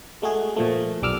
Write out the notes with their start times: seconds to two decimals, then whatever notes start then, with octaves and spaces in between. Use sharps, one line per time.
0.22 G#3 A3 F#4 G#4
0.56 A#2 F3 A3
1.02 B1 G3 D6 E6 F6